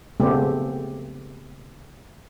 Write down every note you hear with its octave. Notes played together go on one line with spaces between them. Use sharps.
C#3 A3 B3 C4 G4